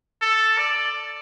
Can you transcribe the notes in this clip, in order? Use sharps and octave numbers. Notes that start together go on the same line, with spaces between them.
A4
D5